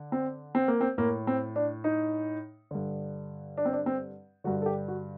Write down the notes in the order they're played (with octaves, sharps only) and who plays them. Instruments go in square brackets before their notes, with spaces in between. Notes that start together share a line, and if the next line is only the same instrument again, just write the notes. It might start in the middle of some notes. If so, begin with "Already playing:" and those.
Already playing: [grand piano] D3
C4
C4
A#3
C4
A2 A#3
C4
D4
D#4
G2 D3
D4
C4
D4
C4
G2 D3 F#4
A4
G4
F#4